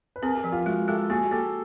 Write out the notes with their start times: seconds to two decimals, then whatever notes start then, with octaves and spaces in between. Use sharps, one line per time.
0.16 B4
0.22 C4 G#4 A#4
0.37 G#4 A#4
0.44 F3
0.52 F4 G4
0.66 G#3 F#4 G#4
0.88 G#3 G4 A4
1.10 A#3 F#4 G#4
1.31 A#3 G4 A4